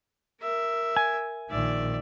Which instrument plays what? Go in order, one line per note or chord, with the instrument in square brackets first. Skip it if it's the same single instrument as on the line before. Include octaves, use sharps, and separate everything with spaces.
[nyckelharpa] A#4 E5
[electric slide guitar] G#5
[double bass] A#1 D#3 [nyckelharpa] D5 E5